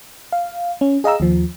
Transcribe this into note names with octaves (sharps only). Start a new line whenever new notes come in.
F5
C#4
G#4 D#5 F5 A#5 E6
D#2 F3